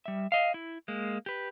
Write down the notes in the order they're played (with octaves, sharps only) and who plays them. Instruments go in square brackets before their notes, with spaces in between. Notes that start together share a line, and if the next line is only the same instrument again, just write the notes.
[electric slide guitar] G3 E5
D#5 F5
E4
G#3 A#3
G4 B4